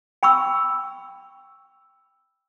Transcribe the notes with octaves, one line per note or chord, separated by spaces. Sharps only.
G5 B5 C#6 E6